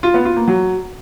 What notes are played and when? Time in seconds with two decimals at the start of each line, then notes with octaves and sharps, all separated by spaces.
0.03 F4
0.14 B3
0.25 F4
0.36 A#3
0.48 F#3